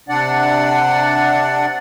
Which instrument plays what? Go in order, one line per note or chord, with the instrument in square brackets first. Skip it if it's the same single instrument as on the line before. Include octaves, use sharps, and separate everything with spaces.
[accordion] C3 D4 D5 F#5